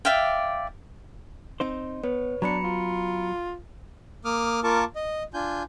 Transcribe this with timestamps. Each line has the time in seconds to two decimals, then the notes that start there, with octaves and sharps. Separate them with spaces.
0.05 D5 E5 F5 G5
1.60 C4 D#4 C5
2.04 B3 B4 C#5
2.42 F#3 B3 D4 A#5 B5 C#7
2.64 F4
4.25 A#3 D6 D#6 F6
4.64 A#3 F4 A#4 A5 C#6 D6
4.95 D#5
5.34 D4 F4 G#5 G6